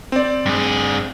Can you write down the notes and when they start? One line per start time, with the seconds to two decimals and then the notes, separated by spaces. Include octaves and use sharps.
0.12 C4 D5
0.46 G2 G#4